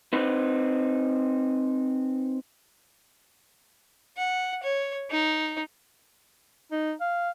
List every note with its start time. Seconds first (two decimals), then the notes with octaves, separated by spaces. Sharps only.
0.13 C4 D#4 B4
4.17 F#5
4.63 C#5
5.10 D#4
6.71 D#4
7.01 F5